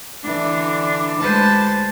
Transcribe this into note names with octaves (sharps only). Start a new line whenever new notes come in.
D3 E3 D4
D2 G#3 B4 C5 A5 A6